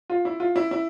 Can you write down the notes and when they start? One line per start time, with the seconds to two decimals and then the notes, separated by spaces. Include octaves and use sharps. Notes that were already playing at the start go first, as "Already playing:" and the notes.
0.10 F4
0.25 E4
0.40 F4
0.56 E4
0.71 E4